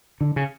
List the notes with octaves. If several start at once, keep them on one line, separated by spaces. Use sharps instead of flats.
D3
C#3